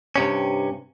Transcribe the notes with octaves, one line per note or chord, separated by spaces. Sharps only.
G2 C3 C#4